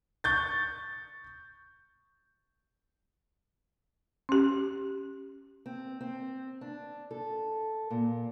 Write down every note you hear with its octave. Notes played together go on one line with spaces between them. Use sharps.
C#6 G6 A6
C#4 G4
C4
C4
D4
A4
A#2